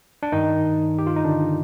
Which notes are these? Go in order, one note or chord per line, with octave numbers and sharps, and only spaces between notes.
D4
G2 D#3 D#4
G4
F4
D#4
D3 D4